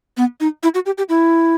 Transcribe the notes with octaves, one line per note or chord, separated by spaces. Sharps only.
B3
D#4
E4
F#4
G4
G4
E4